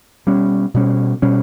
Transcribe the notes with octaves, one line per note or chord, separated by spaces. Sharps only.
B2 G3 C#4
B2 G3 C#4
B2 G3 C#4